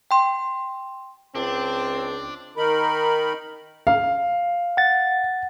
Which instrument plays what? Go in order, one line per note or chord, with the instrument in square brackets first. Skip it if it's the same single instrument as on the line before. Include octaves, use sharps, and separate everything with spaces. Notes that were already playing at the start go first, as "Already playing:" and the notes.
[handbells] G5 C6
[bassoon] C#2 [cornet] C4 [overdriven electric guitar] D4
[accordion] D#3 D#4 A#4 B5
[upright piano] F5
[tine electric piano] F#5 A6